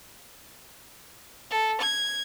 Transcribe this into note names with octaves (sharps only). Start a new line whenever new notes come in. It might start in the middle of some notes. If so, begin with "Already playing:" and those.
A4
G#6